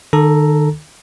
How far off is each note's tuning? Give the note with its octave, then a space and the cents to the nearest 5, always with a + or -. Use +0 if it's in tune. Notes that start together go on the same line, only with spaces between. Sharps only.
D#3 -40 A4 +0 A#5 +0